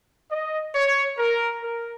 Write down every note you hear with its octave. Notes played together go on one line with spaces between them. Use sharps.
D#5
C#5
A#4
A#4